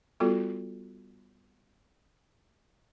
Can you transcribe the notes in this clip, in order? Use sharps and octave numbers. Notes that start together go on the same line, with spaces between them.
G3 B3 F4 F#4 A4